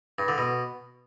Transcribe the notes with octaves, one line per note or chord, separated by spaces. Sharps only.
G2
D3
B2